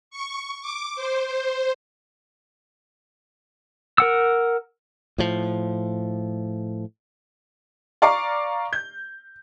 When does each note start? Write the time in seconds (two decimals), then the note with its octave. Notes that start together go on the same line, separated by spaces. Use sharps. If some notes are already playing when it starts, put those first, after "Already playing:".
0.11 C#6
0.61 D6
0.95 C5
1.26 C5
3.98 A#4 F#5 E6
5.18 A2 F3
8.02 D5 F5 A#5 C#6 D6 C7
8.73 G6